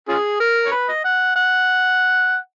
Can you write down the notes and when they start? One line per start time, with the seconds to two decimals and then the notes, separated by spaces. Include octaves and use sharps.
0.09 C#4 F4 G#4
0.40 A#4
0.65 C#5
0.72 B4
0.89 D#5
1.04 F#5
1.36 F#5